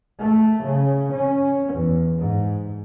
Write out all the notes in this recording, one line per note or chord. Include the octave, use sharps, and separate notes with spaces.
A3
C#3
C#4
E2
G#2